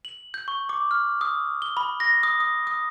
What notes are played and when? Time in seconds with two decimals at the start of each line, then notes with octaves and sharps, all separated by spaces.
0.05 F#7
0.34 G6
0.48 C#6
0.69 D6
0.91 F6
1.21 D#6
1.62 G7
1.77 B5
2.00 A#6
2.23 D#6
2.40 D#6
2.67 D#6